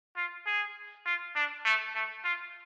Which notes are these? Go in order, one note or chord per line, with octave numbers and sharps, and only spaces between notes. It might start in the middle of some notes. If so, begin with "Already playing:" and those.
F4
G#4
F4
D4
A3
A3
F4